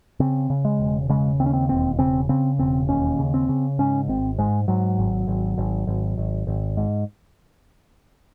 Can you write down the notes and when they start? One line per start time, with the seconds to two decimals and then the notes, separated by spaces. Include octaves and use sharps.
0.20 C#3 C4
0.50 C#3
0.65 G#3
0.80 E1
1.09 C#3 G#3
1.40 D#2 C4
1.46 C#4
1.53 C4
1.69 E1 C4
1.99 C#3 C4
2.29 C#3 C4
2.59 E1 C4
2.89 D#2 C#4
3.19 C#3
3.34 C4
3.49 C#3
3.79 G#2 C#4
4.08 G#1 C4
4.38 G#2 G#3
4.68 G#2 F#3
4.98 G#1
5.27 G#1
5.58 G#1
5.87 G#1
6.18 G#1
6.47 G#1
6.77 G#2